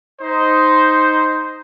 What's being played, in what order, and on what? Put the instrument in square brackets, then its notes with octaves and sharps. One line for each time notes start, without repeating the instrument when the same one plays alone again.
[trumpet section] D#4 C5